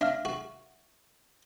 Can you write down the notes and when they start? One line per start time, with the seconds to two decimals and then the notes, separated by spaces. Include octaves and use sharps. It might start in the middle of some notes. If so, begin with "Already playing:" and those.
0.01 D4 E5 F5 F6
0.25 F#4